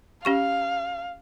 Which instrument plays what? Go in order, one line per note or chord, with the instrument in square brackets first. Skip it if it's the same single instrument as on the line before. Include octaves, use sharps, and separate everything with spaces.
[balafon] C#4 G4 C#6 [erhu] F5